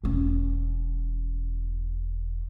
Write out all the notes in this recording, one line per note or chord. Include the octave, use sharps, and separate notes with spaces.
E1 C#4